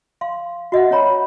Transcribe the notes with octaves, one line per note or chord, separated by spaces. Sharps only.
F5 C6
F#4 D#5 E5 F#5
C#4 F#4 C#5 A#5 B5